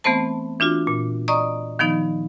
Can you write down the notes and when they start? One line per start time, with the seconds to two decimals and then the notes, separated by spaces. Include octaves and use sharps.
0.04 E3 A3 B3 C4 C5 A5
0.60 E3 D4 F4 F#4
0.87 A#2
1.28 D5 D#5 A#5 C#6 D#6
1.79 D#3 F3 B3 D#4